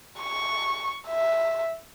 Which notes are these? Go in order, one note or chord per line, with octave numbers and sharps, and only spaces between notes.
C#6
E5